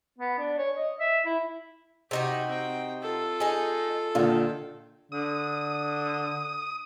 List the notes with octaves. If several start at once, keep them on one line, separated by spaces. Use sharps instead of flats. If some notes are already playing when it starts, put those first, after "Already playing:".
B3
D4
C#5
D#5
E5
E4
C3 D#4 F#4 G4
C4 G5
F4 A4
D#4 G#4
A#2 D3 D#3
D3 D#6